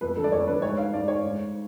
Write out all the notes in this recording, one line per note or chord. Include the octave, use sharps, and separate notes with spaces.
F2 B4
D3 A4
D5
F2 C#5
D3 B4
G#2 C#5
F5
G#2 D5
C#5
G#2